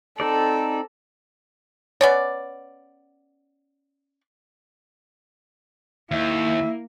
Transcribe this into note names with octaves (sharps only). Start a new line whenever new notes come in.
C4 D#4 A4 D5
B3 C#4 C#5 D5
D#2 A#3 E4 E5